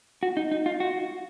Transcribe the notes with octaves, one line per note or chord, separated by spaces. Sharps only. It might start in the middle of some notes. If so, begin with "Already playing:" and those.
F#4
D#4
D#4
F4
F#4